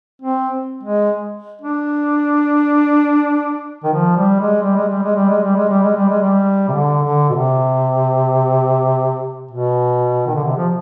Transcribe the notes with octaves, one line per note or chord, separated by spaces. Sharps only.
C4
G#3
D4
D#3
F3
G3
G#3
G3
G#3
G3
G#3
G3
G#3
G3
G#3
G3
G#3
G3
G#3
G3
C3
D3
D3
B2
C3
B2
D#3
D3
C3
F3